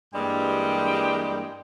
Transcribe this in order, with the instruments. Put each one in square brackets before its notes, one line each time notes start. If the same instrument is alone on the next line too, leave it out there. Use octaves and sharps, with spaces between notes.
[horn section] G2 E3 G3 G#3 A#3 G5